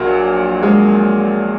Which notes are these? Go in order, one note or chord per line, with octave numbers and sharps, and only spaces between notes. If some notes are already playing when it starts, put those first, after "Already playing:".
Already playing: A#1 A#2 F#3
G#3